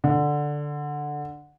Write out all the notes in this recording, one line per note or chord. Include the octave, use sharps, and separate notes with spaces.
D3